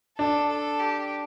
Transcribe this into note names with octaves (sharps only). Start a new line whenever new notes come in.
D4 A4
A4
G4